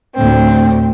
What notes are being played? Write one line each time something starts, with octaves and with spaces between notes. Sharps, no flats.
D2 A2 C4